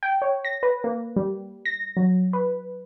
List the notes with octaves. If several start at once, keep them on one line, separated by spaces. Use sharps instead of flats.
G5
C#5
A#6
B4
A#3
G3
A#6
F#3
B4